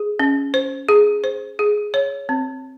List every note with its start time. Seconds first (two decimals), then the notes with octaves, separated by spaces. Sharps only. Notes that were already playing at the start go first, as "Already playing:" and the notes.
Already playing: G#4
0.19 C#4
0.54 C5
0.89 G#4
1.24 C5
1.59 G#4
1.94 C#5
2.29 C4